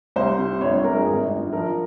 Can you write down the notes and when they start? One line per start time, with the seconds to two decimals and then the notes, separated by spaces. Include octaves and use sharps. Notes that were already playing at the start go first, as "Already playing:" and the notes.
0.16 C2 C5
0.38 C3
0.61 G1 C#5
0.73 C#5
0.84 G1 A#4
0.96 G#4
1.07 G#1
1.29 G#1
1.52 F3 A#4